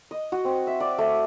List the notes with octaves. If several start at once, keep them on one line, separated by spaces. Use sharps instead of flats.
D#5
F#4
C4
E5
D5
A3